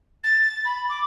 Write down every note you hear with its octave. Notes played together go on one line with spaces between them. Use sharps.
A6
B5
D6